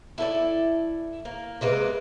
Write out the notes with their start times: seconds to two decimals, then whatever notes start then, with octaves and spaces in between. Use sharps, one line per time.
0.18 E4 A4 B4 D5
1.25 A#3
1.61 C3 G#3 A#3 B4